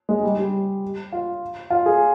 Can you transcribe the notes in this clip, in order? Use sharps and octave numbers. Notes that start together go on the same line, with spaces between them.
G#3
G3
G3
F4
F4
G#4